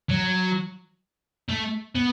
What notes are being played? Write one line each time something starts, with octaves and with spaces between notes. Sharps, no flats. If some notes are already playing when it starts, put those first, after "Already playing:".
F#3
A3
B3